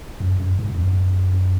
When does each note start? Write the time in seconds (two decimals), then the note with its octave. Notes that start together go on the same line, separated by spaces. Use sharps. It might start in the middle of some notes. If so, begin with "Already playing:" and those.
0.20 F#2
0.40 F#2
0.59 G#2
0.70 E2
0.78 F#2